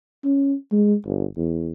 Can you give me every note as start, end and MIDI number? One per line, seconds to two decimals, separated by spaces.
0.24 0.54 61
0.72 0.95 56
1.05 1.25 31
1.37 1.72 40